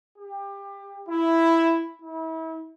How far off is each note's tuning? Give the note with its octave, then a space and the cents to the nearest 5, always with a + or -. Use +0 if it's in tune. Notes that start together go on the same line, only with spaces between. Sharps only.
G4 +25
E4 +0
E4 -35